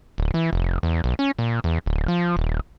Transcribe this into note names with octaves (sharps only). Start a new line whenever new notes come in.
D1
E3
F1
E2
B1
C#4
A#2
E2
D1
F3
D#1